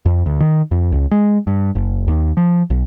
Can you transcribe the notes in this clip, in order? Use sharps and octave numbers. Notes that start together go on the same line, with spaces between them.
F2
D2
D#3
F2
C#2
G#3
G2
F#1
D#2
F3
B1